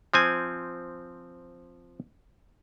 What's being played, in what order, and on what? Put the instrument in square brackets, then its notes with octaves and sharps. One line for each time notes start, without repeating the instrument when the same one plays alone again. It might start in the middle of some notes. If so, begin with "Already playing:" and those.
[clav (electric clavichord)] F3 C4 G#5